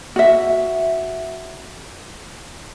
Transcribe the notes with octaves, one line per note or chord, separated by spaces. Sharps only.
F#4 E5